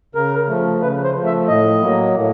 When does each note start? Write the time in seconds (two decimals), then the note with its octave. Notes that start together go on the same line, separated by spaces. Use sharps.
0.15 C#3 A#4
0.48 F3 A3
0.81 C#3 B4
1.04 C5
1.15 F3 A3
1.26 E5
1.48 A2 D#5
1.82 F#3 A#3
2.15 A2